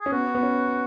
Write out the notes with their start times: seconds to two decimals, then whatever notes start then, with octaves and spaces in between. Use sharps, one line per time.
0.01 C#4 G#4
0.12 B3 F#4
0.35 B3
0.43 C#4